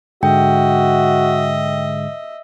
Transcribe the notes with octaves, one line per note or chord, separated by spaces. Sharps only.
G#2 D3 G#3 F#4 D#5 E5 G5